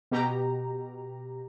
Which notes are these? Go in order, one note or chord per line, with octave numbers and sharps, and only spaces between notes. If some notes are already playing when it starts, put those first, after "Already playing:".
B2 G4 A#5